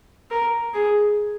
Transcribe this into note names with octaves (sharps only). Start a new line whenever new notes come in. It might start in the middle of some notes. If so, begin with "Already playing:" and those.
A#4
G#4